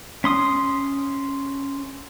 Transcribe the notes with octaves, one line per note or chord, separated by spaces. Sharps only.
C#4 C6 D#6